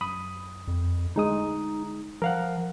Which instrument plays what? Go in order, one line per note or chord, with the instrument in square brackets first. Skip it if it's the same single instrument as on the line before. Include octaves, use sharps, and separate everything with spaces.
[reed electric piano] F#2 B5 D#6
[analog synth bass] F2
[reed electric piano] D2 G#3 D#6 [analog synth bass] D#4
[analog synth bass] F3 [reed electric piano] A#4 F5 F#5